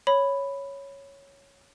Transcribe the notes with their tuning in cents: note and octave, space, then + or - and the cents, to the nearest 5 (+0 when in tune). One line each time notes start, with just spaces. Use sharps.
C#5 +0 B5 +5